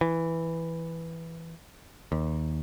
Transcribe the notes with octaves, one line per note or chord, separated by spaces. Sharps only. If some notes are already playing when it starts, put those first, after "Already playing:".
E3
D#2